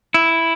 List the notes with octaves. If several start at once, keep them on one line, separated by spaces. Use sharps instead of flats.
E4